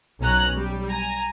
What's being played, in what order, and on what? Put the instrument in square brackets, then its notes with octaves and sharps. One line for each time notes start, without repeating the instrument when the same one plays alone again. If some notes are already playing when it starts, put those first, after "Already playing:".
[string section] B1 C#4 A#5 F#6
G3
G#5 A#5